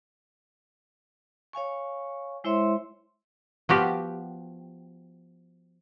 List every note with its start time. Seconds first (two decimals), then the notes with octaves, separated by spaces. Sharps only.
1.53 C#5 F5 G#5 C#6
2.44 G#3 E4 C5 C#5 E5 C6
3.69 F3 B3 F#4 G4